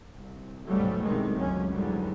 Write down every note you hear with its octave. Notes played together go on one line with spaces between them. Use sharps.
C2
C#2 G#2 B2 F#3 G3 A3
B1 E2 C3 D#3 G#3
C#2 F#2 F#3 C#4
E2 G#2 D3 F#3 G3